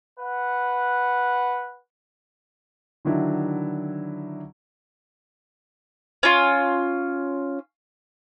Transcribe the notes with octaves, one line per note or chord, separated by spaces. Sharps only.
B4 F#5
D3 D#3 F#3 D4 E4
C#4 F4